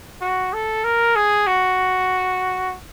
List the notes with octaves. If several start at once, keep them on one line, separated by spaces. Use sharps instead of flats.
F#4
A4
A#4
G#4
F#4